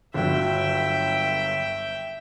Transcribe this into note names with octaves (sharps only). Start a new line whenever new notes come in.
G1 F#3 E5 G5